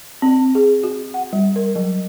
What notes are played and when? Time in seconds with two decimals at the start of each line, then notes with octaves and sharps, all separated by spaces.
0.22 C4
0.55 G#4
0.83 F#4
1.14 F#5
1.33 G3
1.56 A#4
1.76 F#3